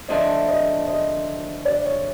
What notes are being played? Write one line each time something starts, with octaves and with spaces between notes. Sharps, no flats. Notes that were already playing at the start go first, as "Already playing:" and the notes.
D2 D3 F3 A3 D4 D#5
D#5
D#5
D5
C#5